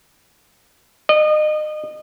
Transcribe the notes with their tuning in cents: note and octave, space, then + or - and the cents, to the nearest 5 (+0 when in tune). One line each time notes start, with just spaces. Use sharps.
D#5 -30